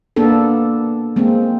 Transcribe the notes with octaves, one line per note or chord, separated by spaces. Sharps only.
A#3 B3 D4 A4
G#3 A#3 C4